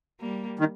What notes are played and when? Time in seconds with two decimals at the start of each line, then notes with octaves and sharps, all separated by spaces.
0.20 G3 A#3
0.59 D#3